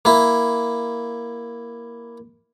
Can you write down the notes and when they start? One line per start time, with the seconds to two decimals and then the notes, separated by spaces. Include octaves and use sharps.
0.05 A#3 E4